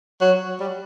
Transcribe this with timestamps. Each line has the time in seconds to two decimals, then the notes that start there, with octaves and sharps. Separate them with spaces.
0.21 F#3
0.60 G3